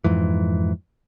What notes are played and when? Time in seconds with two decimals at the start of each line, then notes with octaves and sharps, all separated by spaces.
0.04 F2 G#2 E3